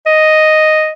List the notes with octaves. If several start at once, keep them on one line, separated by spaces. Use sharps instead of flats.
D#5